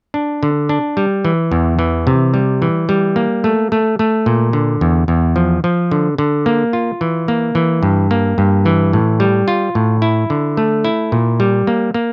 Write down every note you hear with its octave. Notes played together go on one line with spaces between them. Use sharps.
D4
D3
D4
G3
E3
E2
E3
C3
G3
E3
G3
A#3
A3
A3
A3
A#2
D3
E2
E2
F3
F3
D3
D3
A#3
F4
E3
A#3
E3
G2
A#3
G2
E3
A2
G3
F4
A2
E4
D3
A3
E4
A#2
G3
A#3
A#3